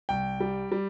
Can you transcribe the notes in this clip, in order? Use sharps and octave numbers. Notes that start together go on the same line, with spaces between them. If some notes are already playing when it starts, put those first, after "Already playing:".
C2 G5
G3
G3